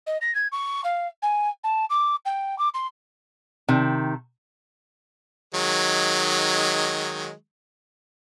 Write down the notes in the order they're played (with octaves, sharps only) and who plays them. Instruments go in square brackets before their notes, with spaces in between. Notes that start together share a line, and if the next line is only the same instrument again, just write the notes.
[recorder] D#5
A#6
G#6
C#6
F5
G#5
A5
D6
G5
D6
C6
[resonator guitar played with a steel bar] C3 D#3
[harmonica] D#3 F#3 G#3